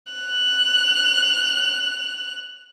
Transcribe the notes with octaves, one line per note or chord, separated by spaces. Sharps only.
F#6 F7